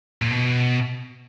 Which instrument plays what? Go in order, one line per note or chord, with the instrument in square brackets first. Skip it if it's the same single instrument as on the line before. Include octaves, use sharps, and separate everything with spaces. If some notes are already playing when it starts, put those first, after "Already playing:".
[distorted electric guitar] A#2
B2